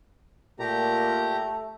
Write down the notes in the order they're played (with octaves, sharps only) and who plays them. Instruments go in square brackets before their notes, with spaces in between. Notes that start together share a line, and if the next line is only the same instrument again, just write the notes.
[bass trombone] A#2 [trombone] A3 [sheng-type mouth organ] G4 A#5